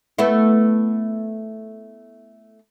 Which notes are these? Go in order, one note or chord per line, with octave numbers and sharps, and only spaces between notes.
A3 B3 E4